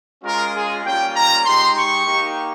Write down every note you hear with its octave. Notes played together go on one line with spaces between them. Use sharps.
G#3 C#4 F4 A#4
G#4
G3 A#3 C#4 F4 G5
A#5
G#3 D#4 G4 C6
C#6
A#3 D#4 G4